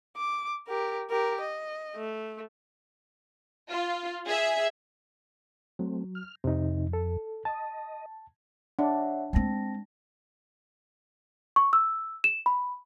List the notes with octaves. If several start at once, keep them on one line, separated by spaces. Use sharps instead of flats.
D6
G4 A#4
G4 A#4
D#5
A3
F4
G#4 E5
F#3 A3 C4
F6
F2 C3 D#4
A4
D#5 A5
D4 C#5 E5 F#5
G#3 C4 G5 A5 A#6
C#6
E6
E7
B5